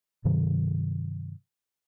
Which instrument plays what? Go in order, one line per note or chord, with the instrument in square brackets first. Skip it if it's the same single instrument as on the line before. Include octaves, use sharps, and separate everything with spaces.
[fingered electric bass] G2 C3 D#3 F#3